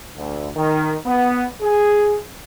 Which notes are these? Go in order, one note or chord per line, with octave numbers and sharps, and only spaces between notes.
D2
D#3
B3
G#4